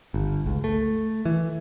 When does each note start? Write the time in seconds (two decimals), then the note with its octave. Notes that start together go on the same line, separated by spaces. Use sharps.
0.14 G1
0.46 C#2
0.64 A3
1.25 E3